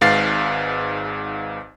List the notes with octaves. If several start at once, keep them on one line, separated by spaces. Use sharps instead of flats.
G#1 G#2 B4 F5 A6 C7